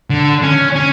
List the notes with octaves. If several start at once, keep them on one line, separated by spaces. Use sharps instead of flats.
D3
C#4
C#4